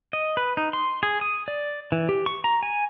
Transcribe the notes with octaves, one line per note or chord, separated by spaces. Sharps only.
D#5
B4
D#4
C6
G#4
D#6
D5
E3
G4
C#6
A#5
G#5